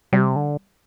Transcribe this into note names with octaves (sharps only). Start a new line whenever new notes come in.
C3 G3
D3